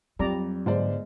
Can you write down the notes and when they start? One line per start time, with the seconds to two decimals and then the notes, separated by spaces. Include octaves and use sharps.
0.19 F2 F#3 G3 D5 A#5
0.66 G1 G#2 G#3 C5 D5